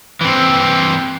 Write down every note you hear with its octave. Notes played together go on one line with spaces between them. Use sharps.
E3 C4